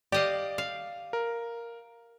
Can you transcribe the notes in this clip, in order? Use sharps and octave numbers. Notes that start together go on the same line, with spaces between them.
G4 D5 D#5 F5
F5
A#4